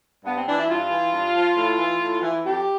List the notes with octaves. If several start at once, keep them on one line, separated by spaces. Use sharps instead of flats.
G2 B3
C4
E3 D4
E4
G2 F4
E3
G2
F3
A2
E3
A2
E3
F2 G4